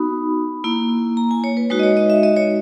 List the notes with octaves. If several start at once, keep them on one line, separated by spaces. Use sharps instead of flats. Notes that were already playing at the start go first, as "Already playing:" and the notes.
Already playing: B3 D#4 F#4 B5
A#3 E4
A#5
G#5
C#5
B4
G#3 D#4 F#4 B4
D#5
C#5
D#5
E5
D#5
C#5